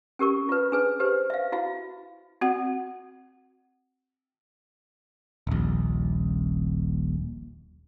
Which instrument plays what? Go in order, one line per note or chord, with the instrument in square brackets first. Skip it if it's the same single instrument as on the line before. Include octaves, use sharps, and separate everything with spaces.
[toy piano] C#4 G4 A#4 C#6
F4 B4
D4 G#4 B4
G4 B4 C5
E5 F5
E4 F#4 F5
[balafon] C4 F#4 F#5
[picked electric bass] D#1 A#1